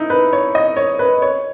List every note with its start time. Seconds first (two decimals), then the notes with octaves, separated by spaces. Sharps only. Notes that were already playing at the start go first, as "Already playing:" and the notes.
Already playing: D#4 E4
0.10 B4
0.33 C#5
0.55 D#5
0.77 C#5
0.99 B4
1.22 C#5